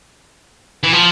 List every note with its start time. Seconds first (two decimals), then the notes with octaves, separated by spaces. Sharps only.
0.84 E3
0.93 F3